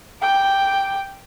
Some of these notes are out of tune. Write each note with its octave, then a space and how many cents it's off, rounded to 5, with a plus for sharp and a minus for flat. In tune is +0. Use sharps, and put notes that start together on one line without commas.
G5 +0 D6 +0